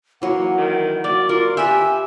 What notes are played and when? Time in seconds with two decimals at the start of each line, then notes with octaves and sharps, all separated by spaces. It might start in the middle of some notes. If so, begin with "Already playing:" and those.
0.22 E3 F#3 A#3 F#5
0.57 D#3
1.04 A#3 F#4 D5
1.29 F4 A#4
1.57 G4 B4 E5 G#5